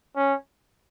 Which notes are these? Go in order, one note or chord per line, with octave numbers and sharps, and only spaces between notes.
C#4